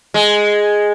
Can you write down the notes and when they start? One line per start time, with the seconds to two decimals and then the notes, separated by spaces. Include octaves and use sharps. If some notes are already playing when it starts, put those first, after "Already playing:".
0.14 G#3